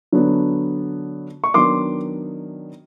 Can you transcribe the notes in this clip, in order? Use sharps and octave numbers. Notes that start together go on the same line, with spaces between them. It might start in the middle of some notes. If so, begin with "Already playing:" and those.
D3 F#3 B3 D4
C#6
D#3 F#3 B3 D4 C6 D6